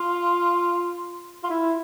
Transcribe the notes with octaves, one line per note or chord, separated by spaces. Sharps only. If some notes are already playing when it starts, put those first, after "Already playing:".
Already playing: F4
F4
E4